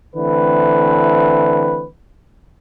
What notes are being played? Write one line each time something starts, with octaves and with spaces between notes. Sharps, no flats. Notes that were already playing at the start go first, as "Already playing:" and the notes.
D3 E3 A3 C4 B4